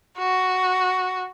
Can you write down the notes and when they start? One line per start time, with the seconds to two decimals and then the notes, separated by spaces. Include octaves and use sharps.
0.19 F#4